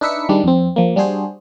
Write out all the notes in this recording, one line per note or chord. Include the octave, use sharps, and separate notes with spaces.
D4 D#4 B4 E5 B6 C#7
D#3 G3 G#3 D4
F2 C4
F3 A#3
G3 D4 F#4 G#4 C5